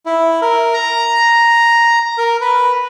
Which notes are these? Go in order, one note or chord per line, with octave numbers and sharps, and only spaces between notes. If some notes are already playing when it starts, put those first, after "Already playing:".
E4
A#4
A#5
A#4
B4